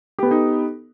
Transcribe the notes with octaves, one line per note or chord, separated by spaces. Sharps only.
B3 D#4 G4 A4